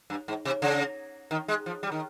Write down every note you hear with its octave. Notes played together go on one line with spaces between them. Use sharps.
G2
G#2
C3
C#3
D#3
G#3
F3
G3
D#3